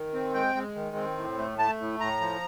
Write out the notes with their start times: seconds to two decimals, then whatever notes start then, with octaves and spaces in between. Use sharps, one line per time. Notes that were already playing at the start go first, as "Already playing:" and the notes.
Already playing: D#3
0.13 C4
0.34 G#3 G5
0.55 G#3
0.75 D#3
0.96 C4
1.17 A2
1.38 A3
1.59 A3 A5
1.80 A2
2.00 A2 A#5
2.21 F3